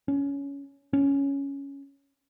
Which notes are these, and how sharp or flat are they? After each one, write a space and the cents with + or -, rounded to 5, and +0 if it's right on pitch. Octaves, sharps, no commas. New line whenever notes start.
C#4 +15
C#4 +5